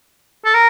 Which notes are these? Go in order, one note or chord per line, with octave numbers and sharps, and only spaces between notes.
A4
A#4